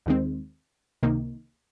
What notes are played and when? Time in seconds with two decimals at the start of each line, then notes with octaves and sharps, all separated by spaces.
0.06 D#2 D#3 G#3 C4
1.03 C#2 C3 D#3 A#3 D#4